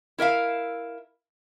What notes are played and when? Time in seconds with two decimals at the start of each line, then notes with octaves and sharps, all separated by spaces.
0.18 E4 A#4 E5 F5